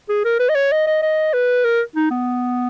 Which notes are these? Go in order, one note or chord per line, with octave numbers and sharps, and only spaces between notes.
G#4
A#4
B4
D#5
C#5
D#5
D#5
D#5
B4
A#4
D#4
B3